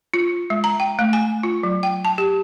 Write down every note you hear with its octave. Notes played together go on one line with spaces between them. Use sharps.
F4
G#3
A#5
G5
A3
G#5
F4
F#3
G5
A5
G4